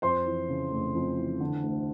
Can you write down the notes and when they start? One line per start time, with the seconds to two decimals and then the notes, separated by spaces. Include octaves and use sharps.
0.02 F2 C5 C6
0.26 E3
0.49 C#3
0.71 F1
0.95 F2
1.18 E3
1.40 D3
1.63 D2